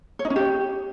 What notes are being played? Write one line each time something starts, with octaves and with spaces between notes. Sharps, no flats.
C#5
D#4
C#4
G4